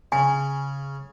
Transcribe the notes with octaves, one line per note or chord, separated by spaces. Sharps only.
C#3 G#5